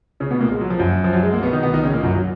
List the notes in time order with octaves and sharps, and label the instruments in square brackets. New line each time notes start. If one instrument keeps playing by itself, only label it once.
[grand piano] C#3 C#4
B2 B3
A#2 A#3
G#3
F#3
F3
F#2 F#3
F3
F#3
G#3
A#3
B2 B3
D#3 D#4
B2 B3
D#3 D#4
C#3 C#4
A#2 A#3
F#2 F#3
F#3